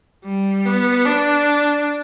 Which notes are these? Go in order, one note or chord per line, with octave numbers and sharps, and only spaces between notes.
G3
B3
D4